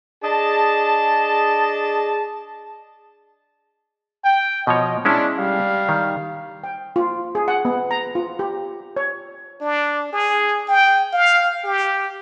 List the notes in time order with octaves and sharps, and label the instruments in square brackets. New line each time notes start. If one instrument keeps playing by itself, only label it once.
[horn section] D4 G#4 D#5 A5
[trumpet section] G5
[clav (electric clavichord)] B2 F3 C#5 [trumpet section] D#5
[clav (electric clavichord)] G#3 C#4 E4 [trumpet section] D4
[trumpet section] G3 F5
[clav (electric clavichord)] D#3
[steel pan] G5
F4
G#4
F#5
B3
A#5
F4
G4
C#5
[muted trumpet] D4
G#4
G5
F5
G4